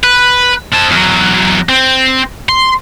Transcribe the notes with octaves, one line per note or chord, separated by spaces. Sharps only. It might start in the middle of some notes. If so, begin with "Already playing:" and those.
B4
C4 A5
E2 F#3
C4
C6